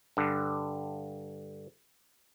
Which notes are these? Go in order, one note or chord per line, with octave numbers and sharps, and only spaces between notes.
G2 D3